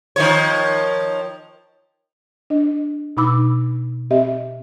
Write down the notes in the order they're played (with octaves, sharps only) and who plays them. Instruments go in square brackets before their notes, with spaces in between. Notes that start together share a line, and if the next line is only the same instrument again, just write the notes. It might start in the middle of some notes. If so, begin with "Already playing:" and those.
[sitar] D#3 F3 C#5
[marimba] D4 D#5
B2 D#4 B5 D6 E6
C4 G4 D#5 E5